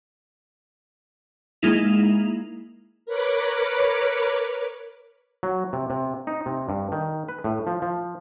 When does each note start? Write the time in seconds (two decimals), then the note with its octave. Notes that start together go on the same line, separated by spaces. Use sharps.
1.62 G#3 A#3 D#4 E4 F7
3.06 A#4 B4 C#5 B5 D6
5.43 F#3
5.73 C3
5.90 C3
6.27 D#4
6.46 C3
6.69 G2
6.92 D#3
7.29 B4
7.44 A2
7.67 F3
7.82 F3